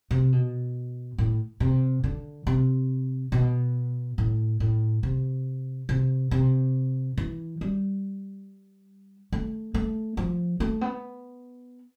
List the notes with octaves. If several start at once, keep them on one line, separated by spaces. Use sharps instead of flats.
C3
B2
A2
C3
D3
C3
B2
A2
A2
C3
C3
C3
E3
G3
A3
A3
F3
A3
B3